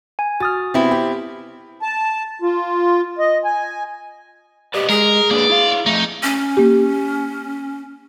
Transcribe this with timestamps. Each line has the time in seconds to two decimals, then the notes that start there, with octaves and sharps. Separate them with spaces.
0.19 G#5
0.40 F#4 D#6 F6 A6
0.74 C3 B3 C4 E4
0.91 G4
1.82 A5
2.42 F4
3.19 D#5
3.45 G#5
4.74 G4 B4 D5 D#5
4.89 G#3 G#4 A#4
5.31 A#3 D4 B4 D5
5.50 E4 F5
5.86 F3 A3 D#4
6.23 C#4
6.57 A#3 G4